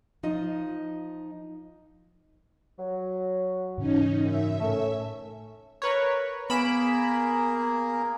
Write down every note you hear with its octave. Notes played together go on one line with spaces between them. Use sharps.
F3 D#4 F4 D#5
F#3
G#2 C#3 E3 C#4 D#4
F#2 E5
A2 A3 C#4 A4
A#4 B4 C#5
A#3 B3 G#4 A#4 B5 D7 E7